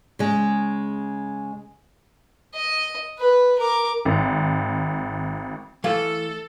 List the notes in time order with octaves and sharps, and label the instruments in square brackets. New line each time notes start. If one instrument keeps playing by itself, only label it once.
[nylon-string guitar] C#3 G#3
[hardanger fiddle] D#5
B4
A#4 D6
[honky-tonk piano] G#1
[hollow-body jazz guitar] E3 A3 F5 [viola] A4